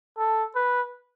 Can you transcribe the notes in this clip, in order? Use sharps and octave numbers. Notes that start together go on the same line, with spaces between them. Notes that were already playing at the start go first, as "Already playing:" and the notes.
A4
B4